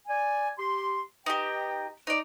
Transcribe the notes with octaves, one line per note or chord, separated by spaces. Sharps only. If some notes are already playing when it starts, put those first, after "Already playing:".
D5 G#5
G4 C6
D#4 G4 B4 D#5 G5
D#4 D5